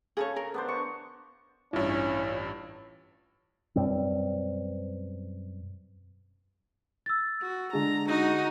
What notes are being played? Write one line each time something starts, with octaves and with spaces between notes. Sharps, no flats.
C#3 G#4 A4 C#5
A#4
B3 D4 C5
C#6
A1 G2 C#4 E4 F4
F#2 B2 G3 C4
E6 A6
F#4
D3 G#3 A#5
D#4 F#4